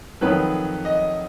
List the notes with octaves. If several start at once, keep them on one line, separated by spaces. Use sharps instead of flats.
F2 D#3 F#3 B4
D#5